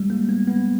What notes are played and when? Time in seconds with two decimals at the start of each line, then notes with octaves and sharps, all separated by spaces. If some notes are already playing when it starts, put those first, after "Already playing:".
Already playing: G3 G#3
0.10 A#3
0.29 B3
0.47 B3